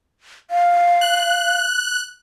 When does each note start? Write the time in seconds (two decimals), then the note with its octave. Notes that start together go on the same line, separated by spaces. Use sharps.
0.51 F5
1.01 F#6